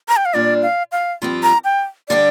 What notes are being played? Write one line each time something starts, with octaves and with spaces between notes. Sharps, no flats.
A#5
G5
F5
A#2 G3 D4 F4 D5
F5
F5
G2 F3 C4 G4
A#5
G5
D3 G3 D4 G4 D5